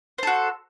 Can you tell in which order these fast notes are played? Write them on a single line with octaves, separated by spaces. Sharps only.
C5 A4 F#4